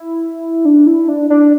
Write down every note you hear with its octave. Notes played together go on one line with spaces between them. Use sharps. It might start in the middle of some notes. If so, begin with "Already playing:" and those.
Already playing: E4
D4
E4
D4
D4